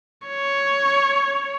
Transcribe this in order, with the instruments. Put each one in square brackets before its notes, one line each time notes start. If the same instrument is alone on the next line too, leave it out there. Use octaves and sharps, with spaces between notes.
[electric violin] C#5